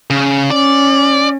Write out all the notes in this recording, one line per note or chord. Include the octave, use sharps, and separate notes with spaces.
C#3
C#4 D5